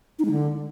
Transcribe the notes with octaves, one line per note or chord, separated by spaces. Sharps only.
D#4
G#3
D3